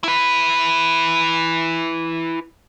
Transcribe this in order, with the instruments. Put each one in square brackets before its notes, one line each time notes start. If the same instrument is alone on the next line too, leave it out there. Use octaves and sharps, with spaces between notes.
[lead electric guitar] E4 B4